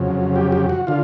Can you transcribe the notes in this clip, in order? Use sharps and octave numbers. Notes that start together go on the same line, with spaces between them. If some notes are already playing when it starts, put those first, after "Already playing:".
Already playing: F2 C#3 F#3
G4
G4
F#4
D3 F4